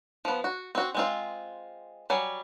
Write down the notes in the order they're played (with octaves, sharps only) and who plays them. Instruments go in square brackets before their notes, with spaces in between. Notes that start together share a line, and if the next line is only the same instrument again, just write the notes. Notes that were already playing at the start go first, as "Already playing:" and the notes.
[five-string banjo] F3 B3
F#4
C4 F#4
G#3 C4 F4
F#3 G3 G#5